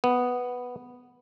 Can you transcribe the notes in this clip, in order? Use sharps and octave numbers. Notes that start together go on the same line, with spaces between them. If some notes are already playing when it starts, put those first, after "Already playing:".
B3